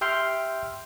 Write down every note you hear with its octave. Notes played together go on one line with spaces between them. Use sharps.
G4 E5 G5 C6 F6